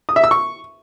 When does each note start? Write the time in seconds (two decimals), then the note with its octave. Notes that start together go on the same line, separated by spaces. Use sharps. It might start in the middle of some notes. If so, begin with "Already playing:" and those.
0.09 D#6
0.16 E5
0.24 E6
0.31 C#6